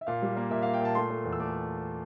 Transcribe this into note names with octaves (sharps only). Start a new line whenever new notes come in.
E5
A#2 F5
G3
A#3
A#2 E5
A#3 F5
G5
A#2 A5
A3 C6
A3
E2
E6
A3 D6